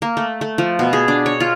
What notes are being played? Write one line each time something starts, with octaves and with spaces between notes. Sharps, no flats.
A#3
A3
A3
F3
B2
G#4
D4
C#5
F4